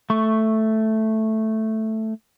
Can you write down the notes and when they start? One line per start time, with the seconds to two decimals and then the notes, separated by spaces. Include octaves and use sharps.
0.10 A3 C#6